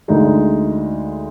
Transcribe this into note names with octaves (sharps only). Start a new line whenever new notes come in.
D2 D3 G#3 D#4